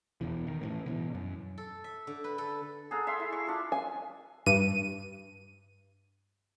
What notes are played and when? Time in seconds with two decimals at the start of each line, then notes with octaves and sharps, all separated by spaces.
0.21 E1 E2 B2 E3
0.47 D#3
0.61 A2 C#3 E3
0.86 B2 D#3 E3
1.15 F#2
1.58 A4
1.84 E5
2.07 D3
2.24 B4
2.38 A4
2.91 G#4 A4 F#5 A#5
3.07 E5 F5 C6
3.20 E4
3.32 C#6
3.47 D4 F4
3.72 G#5
4.46 G2 D#7